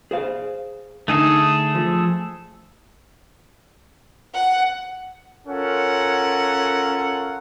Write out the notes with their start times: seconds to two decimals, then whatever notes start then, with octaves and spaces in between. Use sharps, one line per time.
0.11 G#4 C5 F5
1.08 D3 A3 D#4 G#4 A4
1.75 F3
4.34 F#5
5.47 C#4 F4 A4 A#4 F#5